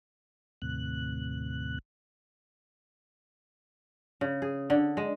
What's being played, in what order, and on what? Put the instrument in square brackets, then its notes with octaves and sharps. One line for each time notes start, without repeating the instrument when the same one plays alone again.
[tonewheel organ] D#2 A2 C3 F#6
[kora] C#3
G#4
D3
G#3